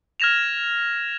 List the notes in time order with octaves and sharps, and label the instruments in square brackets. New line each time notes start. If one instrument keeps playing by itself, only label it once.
[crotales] F6 G#6 A#6 E7 F7